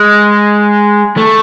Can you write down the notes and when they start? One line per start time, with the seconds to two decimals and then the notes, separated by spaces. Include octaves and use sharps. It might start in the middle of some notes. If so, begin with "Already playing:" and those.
Already playing: G#3
1.17 A3